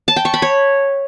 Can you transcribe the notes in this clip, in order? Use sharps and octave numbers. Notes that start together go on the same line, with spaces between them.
A5
G5
C#6
B5
C#5